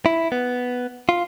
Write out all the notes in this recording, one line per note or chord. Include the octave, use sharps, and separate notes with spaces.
E4
B3
F4